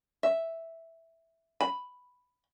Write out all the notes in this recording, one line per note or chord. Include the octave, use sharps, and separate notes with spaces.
E5
B5